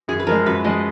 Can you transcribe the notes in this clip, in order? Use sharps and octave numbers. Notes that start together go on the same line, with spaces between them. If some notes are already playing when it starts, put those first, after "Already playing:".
F#2 G#4
B4
F3 G#3 A#4
F#2 B4
F3 G#3 D#5